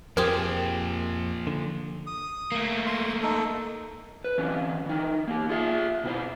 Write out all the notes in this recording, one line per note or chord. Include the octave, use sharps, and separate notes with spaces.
F2 A#2 F3 G4 G#4 A#4 C5
D3
D#6
A3 A#3
C6
D#4 A4
B4
E3 C4 C#4
E3 D#4
A#3 G4
F4 G#4 E5
B2 E4 C5